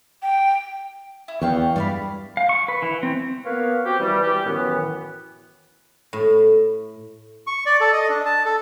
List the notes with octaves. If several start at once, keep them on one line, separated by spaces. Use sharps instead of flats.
G5
E4
E2 F5 G5 C#6
G2 D5 F5 B5
F5
C#6
B4
E3
C4
A#3 B3 A#4 B4 C#5 F5
C4 F#4 G4
E3 G3
G4
F#2 A2 D#3 E3 B3
A2
C#6
D5
A4
D#5
D4
A5
A4